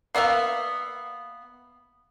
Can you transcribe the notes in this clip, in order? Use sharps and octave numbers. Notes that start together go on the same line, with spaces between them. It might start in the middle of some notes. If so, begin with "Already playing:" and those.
A#3 B3 E5 F5